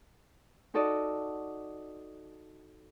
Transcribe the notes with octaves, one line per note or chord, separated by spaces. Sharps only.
D#4 F#4 A4 D5 D#5